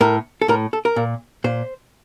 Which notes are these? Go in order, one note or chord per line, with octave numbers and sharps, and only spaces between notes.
A2 A#4
A4
A2 A#4
A4
A#4
A#2
A#2 C5